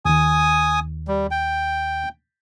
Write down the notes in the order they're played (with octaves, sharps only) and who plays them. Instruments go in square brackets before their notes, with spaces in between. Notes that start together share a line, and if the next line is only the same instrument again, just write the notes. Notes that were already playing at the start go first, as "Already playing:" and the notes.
[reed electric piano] D#2 D#3 [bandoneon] G#5 D#6
[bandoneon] G3
G5